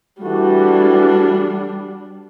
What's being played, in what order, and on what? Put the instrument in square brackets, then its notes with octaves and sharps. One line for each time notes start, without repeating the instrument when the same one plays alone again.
[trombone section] E3 A3 F#4 [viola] G3 D4